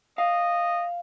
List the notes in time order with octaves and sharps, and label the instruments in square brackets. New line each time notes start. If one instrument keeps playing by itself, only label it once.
[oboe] D#5 [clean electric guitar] F5